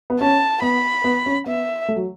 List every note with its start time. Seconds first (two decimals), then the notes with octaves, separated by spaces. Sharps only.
0.10 B3
0.20 C#4 A5
0.62 B3 B5
1.04 B3
1.26 C#4
1.46 B3 E5
1.88 A3
1.96 F#3